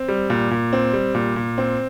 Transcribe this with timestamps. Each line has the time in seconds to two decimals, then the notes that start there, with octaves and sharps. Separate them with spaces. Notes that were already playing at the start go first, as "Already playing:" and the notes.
Already playing: C4
0.08 G3
0.30 A#2
0.51 A#2
0.73 C4
0.93 G3
1.15 A#2
1.36 A#2
1.58 C4